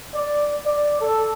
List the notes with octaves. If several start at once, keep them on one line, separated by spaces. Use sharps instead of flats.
D5
D5
A4